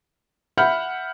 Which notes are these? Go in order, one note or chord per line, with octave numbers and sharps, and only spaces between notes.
E5 F#5 B5 F6 G6